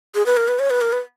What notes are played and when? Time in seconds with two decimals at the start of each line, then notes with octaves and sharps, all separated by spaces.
0.15 G#4
0.26 B4
0.37 A#4
0.48 B4
0.59 C#5
0.70 B4
0.81 A#4
0.92 B4